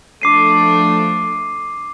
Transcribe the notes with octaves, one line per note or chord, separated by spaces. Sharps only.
F3 A3 D4 D6 C7 D#7